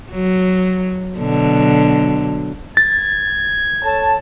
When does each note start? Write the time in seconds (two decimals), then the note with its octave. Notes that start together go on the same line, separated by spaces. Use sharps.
0.12 F#3
1.18 B2 D3 F#3
2.77 G#6 A6
3.82 A4 C#5 A5